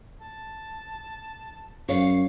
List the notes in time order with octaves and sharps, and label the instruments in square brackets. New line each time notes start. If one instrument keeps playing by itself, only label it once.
[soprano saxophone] A5
[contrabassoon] F#2 [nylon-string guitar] C#5 [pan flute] F5